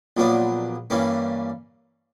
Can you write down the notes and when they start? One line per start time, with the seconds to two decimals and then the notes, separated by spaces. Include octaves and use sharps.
0.17 A#1 A#2 F#3 B3 D4
0.90 G2 E3 G3 A#3 C#4